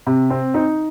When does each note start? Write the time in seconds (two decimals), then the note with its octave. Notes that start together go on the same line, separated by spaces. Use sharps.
0.07 C3
0.30 C4
0.54 D#4